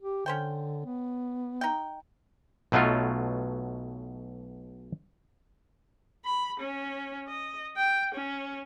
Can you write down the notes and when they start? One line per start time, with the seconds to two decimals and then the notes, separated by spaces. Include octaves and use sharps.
0.02 G4
0.26 D3 C#4 C5 G5
0.85 B3
1.61 D#4 G5
2.72 B1 B2 F#3 A3 F4
6.25 B5
6.60 C#4
7.27 D#5
7.77 G5
8.15 C#4